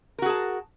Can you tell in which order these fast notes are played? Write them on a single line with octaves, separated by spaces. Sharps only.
A#4 F#4 G#4 A5